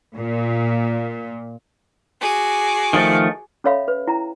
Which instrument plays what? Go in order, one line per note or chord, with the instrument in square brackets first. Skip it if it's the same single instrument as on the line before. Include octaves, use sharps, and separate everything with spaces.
[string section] A#2
[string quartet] F#4 G#4 D6
[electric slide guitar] D#3 F3 A3
[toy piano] C#4 A4 C#5 E5 F5 B5
B4
E4 G5 A#5